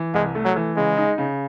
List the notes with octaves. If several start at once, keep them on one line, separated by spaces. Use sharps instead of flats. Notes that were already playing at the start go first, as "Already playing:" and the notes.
Already playing: E3
C2 G#3
A3
F#3
E3
C#3 G#3
D#4
C#3